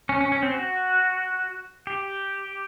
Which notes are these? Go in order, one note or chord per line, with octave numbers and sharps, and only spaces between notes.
C#4
C#4
C#4
C4
F#4
G4